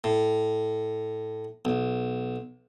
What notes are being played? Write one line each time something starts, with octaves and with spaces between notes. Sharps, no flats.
A2
B1